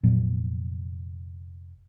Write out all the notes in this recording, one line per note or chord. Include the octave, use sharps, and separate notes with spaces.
F1 A#2 F#3 B3